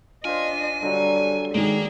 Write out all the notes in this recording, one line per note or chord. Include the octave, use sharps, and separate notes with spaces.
D4 F4 C5 D#5 G#5
D3 F#3 G3
D#3 G#3 A#3 G#4